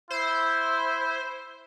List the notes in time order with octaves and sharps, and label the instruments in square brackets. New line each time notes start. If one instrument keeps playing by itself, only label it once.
[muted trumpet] E4 [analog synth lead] C5